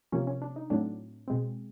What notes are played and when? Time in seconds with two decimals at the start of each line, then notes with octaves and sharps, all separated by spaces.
0.12 C3 F3 A#3 C#4
0.27 C#4
0.42 D4
0.56 D#4
0.70 A2 F#3 A3 C4 D4
1.28 B2 G#3 C4